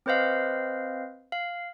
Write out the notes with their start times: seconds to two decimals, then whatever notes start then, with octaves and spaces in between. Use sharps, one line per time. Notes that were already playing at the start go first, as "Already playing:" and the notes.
0.06 C4 B4 C5 D#5 F5
1.32 F5